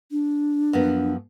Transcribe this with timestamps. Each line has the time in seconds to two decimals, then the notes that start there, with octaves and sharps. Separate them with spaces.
0.12 D4
0.73 F#2 F3 B3